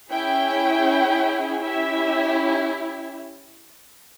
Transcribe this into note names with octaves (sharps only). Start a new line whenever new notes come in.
C#4 E4 G#4 G5
C#4 E4 G4 E5